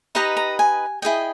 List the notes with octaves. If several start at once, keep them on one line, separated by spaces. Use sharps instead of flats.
D#4 G4 B4 D#5 A#5
A#5
G#5
E4 G#4 D#5 G5